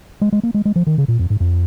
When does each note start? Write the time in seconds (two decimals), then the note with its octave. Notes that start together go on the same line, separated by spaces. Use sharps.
0.21 G#3
0.32 G#3
0.43 A#3
0.54 G#3
0.65 G#3
0.76 F3
0.87 D#3
0.98 C#3
1.08 A#2
1.19 F2
1.30 G#2
1.40 F2